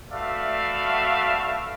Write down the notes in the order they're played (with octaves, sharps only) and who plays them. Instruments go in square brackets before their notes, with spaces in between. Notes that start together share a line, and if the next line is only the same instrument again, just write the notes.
[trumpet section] A3 F#4 B4 D5 E5 F5